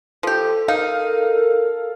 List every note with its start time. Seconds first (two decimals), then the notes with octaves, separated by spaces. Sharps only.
0.23 F3 G4 A4
0.68 D#4 A#4 F5